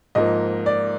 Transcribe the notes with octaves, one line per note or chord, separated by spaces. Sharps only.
G#2 F3 A#3 D#5
D5